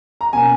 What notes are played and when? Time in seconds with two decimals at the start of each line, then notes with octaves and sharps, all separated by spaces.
0.21 A#5
0.33 B2 A#3 C#4 G#5